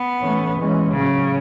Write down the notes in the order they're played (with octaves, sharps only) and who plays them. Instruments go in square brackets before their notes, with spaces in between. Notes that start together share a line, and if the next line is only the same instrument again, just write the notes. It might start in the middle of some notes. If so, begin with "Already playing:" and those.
Already playing: [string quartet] B3
[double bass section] E3 A3 C#4
E3 G#3 C#4
[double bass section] A2 F#3 C#4 [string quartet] C#3